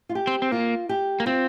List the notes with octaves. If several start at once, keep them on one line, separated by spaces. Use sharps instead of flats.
F4
G4
C4
C4
A#3 F4
G4
A#3
C4 F4